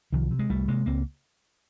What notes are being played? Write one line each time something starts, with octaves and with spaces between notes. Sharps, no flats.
C2 D#3 F3
C3
G#3
C2 G3 A3
C3 G#3 A#3
C#2 A#3 C4